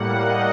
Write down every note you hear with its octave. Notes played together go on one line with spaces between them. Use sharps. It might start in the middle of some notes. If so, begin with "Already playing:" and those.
Already playing: A2 G3 A#3 F#5
D#5